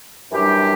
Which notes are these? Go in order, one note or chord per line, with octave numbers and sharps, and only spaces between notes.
F#2 E3 G3 D4 G4